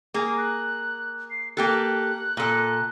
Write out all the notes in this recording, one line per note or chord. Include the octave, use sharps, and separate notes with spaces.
A#3 G#4
F#6
C7
A#3 G4 A4 F#6
A#2 A4